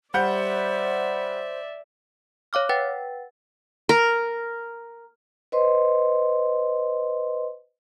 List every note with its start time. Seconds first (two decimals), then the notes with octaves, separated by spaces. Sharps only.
0.14 G3 C5 D5 E5 F#5 G6
2.53 C#5 F5 D6 F6
2.69 B4 F#5 G5 A6
3.89 A#4
5.52 B4 C5 D#5 C6